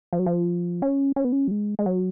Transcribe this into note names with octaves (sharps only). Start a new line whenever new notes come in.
F3
F#3
F3
C#4
C#4
B3
C#4
F#3
G#3
G#3
F#3